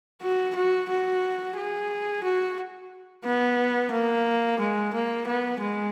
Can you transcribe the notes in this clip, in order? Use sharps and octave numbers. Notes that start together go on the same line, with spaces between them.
F#4
F#4
F#4
G#4
F#4
B3
A#3
G#3
A#3
B3
G#3